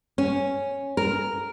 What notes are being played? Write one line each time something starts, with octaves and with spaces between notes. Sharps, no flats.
C#4
A#4